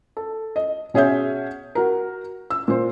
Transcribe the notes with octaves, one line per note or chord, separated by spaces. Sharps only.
A4
D#5
B2 C#4 G#4 C#5 E5 G6
F#4 A#4
E6
A#2 C5